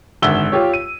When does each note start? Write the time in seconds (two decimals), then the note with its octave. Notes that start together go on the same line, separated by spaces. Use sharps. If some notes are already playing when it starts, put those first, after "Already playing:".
0.22 G#1 D3 E5 E6 G7
0.52 F4 G4 C#5
0.74 D#7